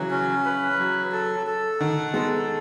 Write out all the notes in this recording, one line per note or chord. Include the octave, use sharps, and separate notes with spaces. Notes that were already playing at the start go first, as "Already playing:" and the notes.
Already playing: C#3 E3 F#3
C#4
B4
F#3
A4
A4
D#3 F#5
G#3 B3 A4